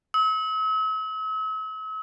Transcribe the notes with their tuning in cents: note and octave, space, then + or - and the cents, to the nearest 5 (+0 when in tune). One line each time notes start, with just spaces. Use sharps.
E6 -45